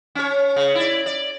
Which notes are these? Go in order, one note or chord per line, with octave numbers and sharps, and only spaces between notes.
C#4 C#5
C#3
E4 D5
D5